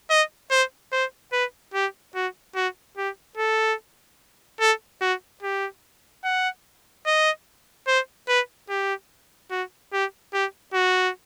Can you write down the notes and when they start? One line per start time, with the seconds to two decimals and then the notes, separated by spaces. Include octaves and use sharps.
0.10 D#5
0.50 C5
0.92 C5
1.32 B4
1.74 G4
2.15 F#4
2.55 F#4
2.97 G4
3.37 A4
4.60 A4
5.01 F#4
5.42 G4
6.24 F#5
7.06 D#5
7.87 C5
8.28 B4
8.69 G4
9.50 F#4
9.93 G4
10.33 G4
10.74 F#4